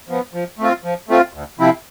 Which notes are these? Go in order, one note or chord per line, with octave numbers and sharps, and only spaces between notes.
F3 B3
F3
A3 C4 F4
F3
A3 C4 F4
D2
C3 F3 C4 E4